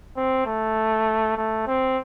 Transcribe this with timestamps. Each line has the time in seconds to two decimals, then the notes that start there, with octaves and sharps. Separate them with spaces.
0.16 C4
0.46 A3
1.37 A3
1.67 C4